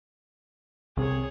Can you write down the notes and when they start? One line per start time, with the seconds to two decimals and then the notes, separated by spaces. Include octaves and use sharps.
0.97 C2 C3 G#4 C#5